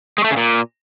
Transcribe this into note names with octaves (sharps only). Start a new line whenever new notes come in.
G#3
A3
C#3
A#2